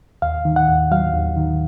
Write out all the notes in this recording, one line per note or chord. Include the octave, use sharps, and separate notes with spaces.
D#2 F5
D#3
F#5
D#2
F#3 F5
D#2
D#3